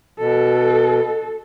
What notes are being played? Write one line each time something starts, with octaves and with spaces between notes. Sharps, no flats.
B2 A4